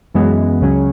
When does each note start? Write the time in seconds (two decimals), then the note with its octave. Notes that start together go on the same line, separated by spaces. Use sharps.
0.14 F#2 E3 G#3 B3
0.61 C#2 C#3 F#3 C#4